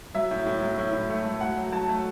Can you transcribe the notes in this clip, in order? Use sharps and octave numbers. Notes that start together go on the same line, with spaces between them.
F#3 E5
A2
A2
F#3
A2
A2
A3
A3
F#3 F#5
F#3
F#3 A5
A3